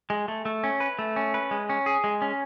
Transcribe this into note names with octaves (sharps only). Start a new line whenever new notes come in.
G#3
A3
A3
C#4
B4
A3
C#4
B4
G#3
C#4
G#4
G#3
C#4